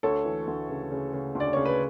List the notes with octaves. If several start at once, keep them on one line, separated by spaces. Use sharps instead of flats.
D2 A4 C#5
E3
D2
C#3
C#3
C#3
D2
D5
C#3 C#5
B4